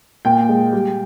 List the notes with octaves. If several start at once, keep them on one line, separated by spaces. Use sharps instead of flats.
A#2 G5
G#3
G3